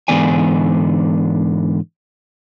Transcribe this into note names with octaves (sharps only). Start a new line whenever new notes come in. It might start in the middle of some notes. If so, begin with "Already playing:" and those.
G#2 D3 E3 B3 D5 G#5